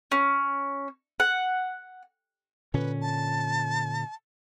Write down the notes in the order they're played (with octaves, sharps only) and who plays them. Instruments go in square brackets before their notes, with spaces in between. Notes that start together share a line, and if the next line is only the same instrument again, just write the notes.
[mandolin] C#4
F#5
[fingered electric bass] A#2 D3 C#4 [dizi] B4
[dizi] A5